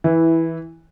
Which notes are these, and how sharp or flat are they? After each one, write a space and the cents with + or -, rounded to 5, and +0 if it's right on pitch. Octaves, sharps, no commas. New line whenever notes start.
E3 -10 E4 +0